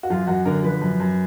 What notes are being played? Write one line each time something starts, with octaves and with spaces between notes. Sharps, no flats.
F#4
F#2 F4
F#2 F#4
D3 A#4
F3 B4
F#2
F#2